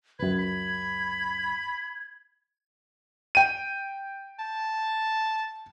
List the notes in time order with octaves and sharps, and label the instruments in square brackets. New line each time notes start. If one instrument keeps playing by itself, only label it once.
[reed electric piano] C#2 F#2 [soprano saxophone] B4 [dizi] G#6
[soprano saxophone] B5
[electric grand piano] G5 D#7
[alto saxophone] A5